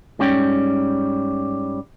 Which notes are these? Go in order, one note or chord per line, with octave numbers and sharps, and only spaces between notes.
G#2 G3 C#4 G5